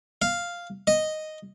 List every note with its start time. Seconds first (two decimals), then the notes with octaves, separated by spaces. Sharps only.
0.22 F5
0.87 D#5